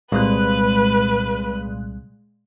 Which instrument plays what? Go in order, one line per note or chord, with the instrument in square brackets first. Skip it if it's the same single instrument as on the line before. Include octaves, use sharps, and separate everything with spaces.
[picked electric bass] C2 [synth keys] A#2 G#3 F#6 [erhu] B4